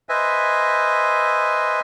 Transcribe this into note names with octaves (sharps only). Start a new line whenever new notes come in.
B4 C5 D#5 E5 G#5